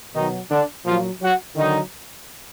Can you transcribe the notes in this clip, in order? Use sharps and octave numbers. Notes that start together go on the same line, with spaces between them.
B2 D#3 F#3 D#4
D3 D4
A#2 F3 F#3 F4
F#3 F#4
D3 D#3 F#3 D#4